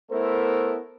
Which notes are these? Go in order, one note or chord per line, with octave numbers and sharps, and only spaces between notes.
A3 B3 E4 A4 A#4 C5